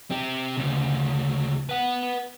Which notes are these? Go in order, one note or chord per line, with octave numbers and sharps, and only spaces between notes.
C4 G4
D2 C#3
B4 F#5